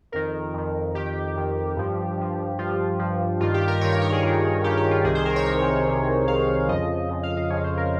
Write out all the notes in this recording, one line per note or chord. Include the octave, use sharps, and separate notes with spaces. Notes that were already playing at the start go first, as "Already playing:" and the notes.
F2 D#3 A#4
F2 D#3
F2 D#3 G4
F2 D#3
G2 F3
G2 F3
G2 F3 F4
G2 F3
G2 D#3 F4
G4
A#4
G2 D#3 C#5
C#5
A#4
G#4
G2 D#3
G2 D#3 G4
G4
F4
C2 C3 D#3 G#4
C5
A#4
C#5
C2 C3 D#3
C2 C3 D#3
C2 C3 D#3 F5
F2 C#3 F3 D#5
F2 C#3 F3 D#5
F5
D#5
F2 C#3 F3 C#5
C5
A#4